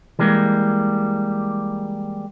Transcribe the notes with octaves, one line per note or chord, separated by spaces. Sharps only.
E3 G3 G#3 A#3